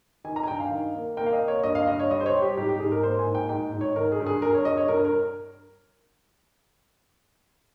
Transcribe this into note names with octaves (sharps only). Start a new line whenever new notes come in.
D#3 G#5
A#5
G#5
G2 G5
F5
D#3
A#3
A#3 G5
F5
D#5
A#3
C#5
G2 D#5
F5
G2 D#5
C#5
G3 D#5
C5
C#5
G3
G4
G#2 G4
G4
G#2 G#4
A#4
A#3 C5
G#5
G#2
G5
G#2 G5
G#2
C#5
D#3 A#4
G#4
G2
G#4
G2 A#4
C#5
G2 D#5
C#5
G2 A#4
A#4